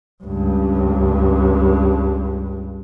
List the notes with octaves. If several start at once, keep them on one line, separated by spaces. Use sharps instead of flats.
C#2 G2